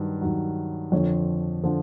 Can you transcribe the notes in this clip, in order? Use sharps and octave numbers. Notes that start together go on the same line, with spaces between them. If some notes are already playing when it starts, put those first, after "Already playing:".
Already playing: G2 D#3 F#3
G2 D#3 F#3
F2 D3 F3 C#5
D3 F3